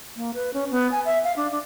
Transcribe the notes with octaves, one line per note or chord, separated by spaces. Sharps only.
A#3
B4
C#4
B3
G#5
E5
F5
D4
D4